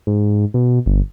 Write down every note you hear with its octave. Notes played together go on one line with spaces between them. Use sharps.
G#2
B2
G1